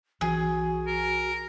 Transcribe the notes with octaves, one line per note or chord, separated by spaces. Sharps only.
B1 E3 F#4 G#4
A#4